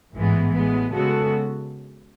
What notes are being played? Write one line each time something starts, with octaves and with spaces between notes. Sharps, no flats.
A1 G#2 E3 G#3 B3
A1 A2 G#3 B3
C#3 G#3 B3 F#4 A4